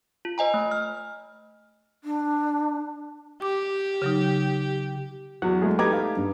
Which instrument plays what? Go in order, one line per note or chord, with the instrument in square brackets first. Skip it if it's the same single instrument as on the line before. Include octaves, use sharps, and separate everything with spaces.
[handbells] F4
C5 D#5 G#5 A#5
A3
F6
[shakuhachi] D4
[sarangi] G4 [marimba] D6
[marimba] C#3 F#3 D#4
[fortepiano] E2 [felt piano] F#3 [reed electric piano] F#5
[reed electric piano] G#3 A3 G#4
[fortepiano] A3 D#4 G4 [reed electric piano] B4 A#5 G#6 [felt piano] D6
[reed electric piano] F5
[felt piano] G2